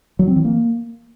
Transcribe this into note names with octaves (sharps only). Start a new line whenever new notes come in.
F#3
C4
E3
A#3